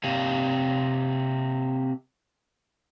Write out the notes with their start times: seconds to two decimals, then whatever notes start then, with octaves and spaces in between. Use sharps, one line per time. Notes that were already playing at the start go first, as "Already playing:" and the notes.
0.04 C3 A#3